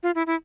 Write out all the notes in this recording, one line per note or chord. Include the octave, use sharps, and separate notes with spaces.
F4
E4
E4